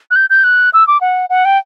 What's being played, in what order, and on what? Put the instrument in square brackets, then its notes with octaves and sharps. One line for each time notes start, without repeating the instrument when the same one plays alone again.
[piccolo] F#6
G6
G6
F#6
E6
D6
F#5
F#5
G5